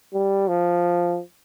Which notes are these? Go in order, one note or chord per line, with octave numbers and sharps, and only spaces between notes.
G3
F3